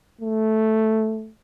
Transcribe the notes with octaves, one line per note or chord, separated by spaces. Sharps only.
A3